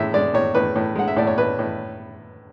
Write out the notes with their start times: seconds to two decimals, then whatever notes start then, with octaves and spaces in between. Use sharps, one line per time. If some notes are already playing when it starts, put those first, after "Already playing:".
Already playing: A2 G#3 E5
0.14 G#3 D5
0.34 A2 C#5
0.55 A2 B4
0.76 A2
0.96 G#3 F#5
1.08 E5
1.17 A2 D5
1.27 C#5
1.38 A2 B4
1.59 A2